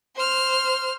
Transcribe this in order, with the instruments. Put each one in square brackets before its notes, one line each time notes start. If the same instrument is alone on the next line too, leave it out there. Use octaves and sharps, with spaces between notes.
[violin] C5 F6